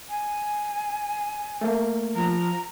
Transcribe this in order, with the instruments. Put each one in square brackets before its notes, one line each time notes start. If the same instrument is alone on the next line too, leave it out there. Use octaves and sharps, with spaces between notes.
[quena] G#5
[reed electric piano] A3 A#3
[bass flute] F3 [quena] A#5